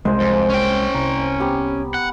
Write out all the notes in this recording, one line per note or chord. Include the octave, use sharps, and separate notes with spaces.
C2 G#3 C5 G#5
F2
C#4 G5
C2 A#5
B3 G4 B4
F#5